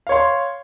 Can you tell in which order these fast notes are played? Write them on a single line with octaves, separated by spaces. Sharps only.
F5 C#5 C6